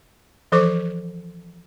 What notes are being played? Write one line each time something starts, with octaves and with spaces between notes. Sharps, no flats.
E3 F3 A4 C5 C#6 D6